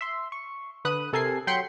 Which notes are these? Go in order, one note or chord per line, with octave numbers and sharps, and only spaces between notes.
E5 C6
C#6
D3 B4 D#6 F#6 D#7
C3 A4 A#4 G#5 G#6 C7
F#3 G5 B5 C6 C#7